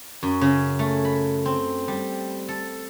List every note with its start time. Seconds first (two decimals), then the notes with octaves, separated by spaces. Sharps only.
0.23 F#2
0.41 C#3
0.79 A3
1.05 B5
1.45 C4
1.88 G3
2.48 A4